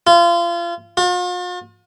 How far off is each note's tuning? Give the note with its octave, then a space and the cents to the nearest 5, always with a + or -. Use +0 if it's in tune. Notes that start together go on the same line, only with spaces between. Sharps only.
F4 -30
F4 +45